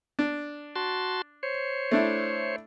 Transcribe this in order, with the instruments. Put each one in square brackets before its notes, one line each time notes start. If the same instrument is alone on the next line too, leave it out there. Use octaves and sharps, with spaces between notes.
[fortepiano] D4
[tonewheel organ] F#4 A5 C6
C5 C#5
[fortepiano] A3 D4 E4